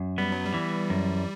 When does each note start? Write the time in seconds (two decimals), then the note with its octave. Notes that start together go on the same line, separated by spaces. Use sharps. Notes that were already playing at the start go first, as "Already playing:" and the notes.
Already playing: F#2
0.18 G3 B3
0.32 F#3
0.45 G3
0.54 E3
0.90 F#2